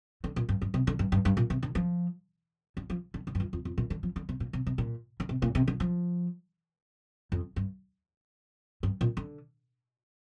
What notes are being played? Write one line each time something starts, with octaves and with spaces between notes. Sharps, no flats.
D3
A#2
G2
G2
C3
D3
G2
G2
G2
A#2
C3
D3
F3
D3
F3
D3
D3
G2
F2
F2
F2
A#2
D3
F3
D3
C3
A#2
C3
C3
A#2
D3
C3
A#2
C3
D3
F3
F2
G2
G2
A#2
D3